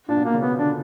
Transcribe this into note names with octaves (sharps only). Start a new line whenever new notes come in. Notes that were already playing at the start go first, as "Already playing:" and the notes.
A#2 D4
B2
A#3
C#3
B2 B3
D3 D4